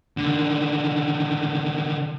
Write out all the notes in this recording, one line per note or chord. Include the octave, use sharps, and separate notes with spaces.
D3 D#3